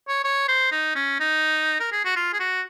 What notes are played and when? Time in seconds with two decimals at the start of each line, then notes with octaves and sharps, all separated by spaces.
0.08 C#5
0.24 C#5
0.48 C5
0.71 D#4
0.95 C#4
1.20 D#4
1.80 A#4
1.92 G#4
2.05 F#4
2.16 F4
2.33 G#4
2.40 F#4